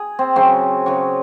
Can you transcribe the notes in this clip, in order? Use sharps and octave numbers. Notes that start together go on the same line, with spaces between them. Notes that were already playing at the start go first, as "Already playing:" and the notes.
Already playing: G#4
C4
C#3 F#3 C4
C#3 F#3